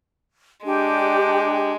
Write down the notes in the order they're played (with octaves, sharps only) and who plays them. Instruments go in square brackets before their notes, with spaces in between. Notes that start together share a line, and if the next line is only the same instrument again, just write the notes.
[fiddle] G#3 [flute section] D4 G4 G5